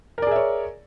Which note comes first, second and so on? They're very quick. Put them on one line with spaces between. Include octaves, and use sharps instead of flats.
A#4 D5 G#4 E5 C#5